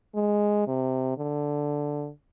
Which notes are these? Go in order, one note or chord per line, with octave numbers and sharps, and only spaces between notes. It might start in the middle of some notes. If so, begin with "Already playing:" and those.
G#3
C3
D3